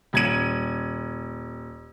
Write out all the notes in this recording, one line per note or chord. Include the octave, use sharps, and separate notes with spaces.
D#1 G#6 D#7